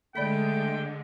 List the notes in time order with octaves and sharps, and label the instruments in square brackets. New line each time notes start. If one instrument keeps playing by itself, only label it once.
[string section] D3 G#3 [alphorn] A3 [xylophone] D5 B5 B6 [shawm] G5